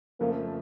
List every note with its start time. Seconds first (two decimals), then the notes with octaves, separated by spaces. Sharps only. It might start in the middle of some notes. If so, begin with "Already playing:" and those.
0.20 F2 C#3 F3 A3 A#3